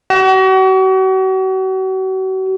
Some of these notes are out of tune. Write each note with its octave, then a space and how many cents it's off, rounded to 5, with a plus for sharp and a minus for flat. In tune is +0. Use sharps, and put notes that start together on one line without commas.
F#4 +40